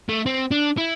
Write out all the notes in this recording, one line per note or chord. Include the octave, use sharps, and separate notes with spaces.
A3
C4
D4
E4